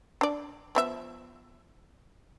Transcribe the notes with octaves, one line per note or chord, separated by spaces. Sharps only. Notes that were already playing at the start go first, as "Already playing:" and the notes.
D4 D5
F3 B3 E5